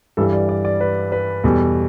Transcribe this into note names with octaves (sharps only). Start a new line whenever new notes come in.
G2 E3 G3 A4
D5
D5
D5
B4
B4
E2 B2 G3 A4